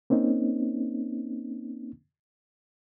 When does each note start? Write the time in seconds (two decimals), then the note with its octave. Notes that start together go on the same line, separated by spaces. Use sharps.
0.10 A#3 C4 C#4 D#4